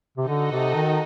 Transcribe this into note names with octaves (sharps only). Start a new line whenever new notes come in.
C3
D3 D#4 F#4 A4 D#5
C3
D#3